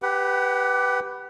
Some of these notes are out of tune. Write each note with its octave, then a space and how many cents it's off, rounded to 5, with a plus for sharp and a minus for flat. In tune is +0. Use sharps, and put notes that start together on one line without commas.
G4 +0 B4 +0 F#5 +25